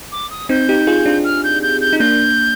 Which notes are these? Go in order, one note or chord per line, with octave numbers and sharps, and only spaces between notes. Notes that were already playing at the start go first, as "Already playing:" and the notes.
D6
D#6
C4 D#4 G6
D#4 G4
F4 G#4
D4 F4
F6
G6
G6
G6
D#4
A#3 D4 G6